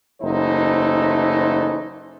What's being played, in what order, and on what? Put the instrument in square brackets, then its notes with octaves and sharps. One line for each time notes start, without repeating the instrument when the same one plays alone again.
[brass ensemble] F#1 E3 A3 D#4 C5